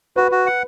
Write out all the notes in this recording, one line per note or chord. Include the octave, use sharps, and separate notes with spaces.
F#4 B4
F#4
F#5